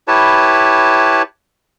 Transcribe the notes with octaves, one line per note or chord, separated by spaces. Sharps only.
E4 G4 B4 C#5 A5